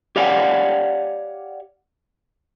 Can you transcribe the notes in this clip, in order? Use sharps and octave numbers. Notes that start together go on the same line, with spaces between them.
G4 C#5 D5 F5 F#5 G#5